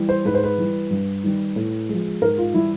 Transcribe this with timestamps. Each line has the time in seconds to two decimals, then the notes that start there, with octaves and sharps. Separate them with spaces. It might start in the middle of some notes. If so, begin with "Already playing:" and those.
Already playing: E3 G3
0.09 C5
0.25 G#2 B4
0.35 C5
0.44 B4
0.58 E3 G3
0.91 G2
1.24 D#3 G3
1.56 A2
1.89 F3 G#3
2.22 G#2 A#4
2.38 F4
2.54 E3 G3 E4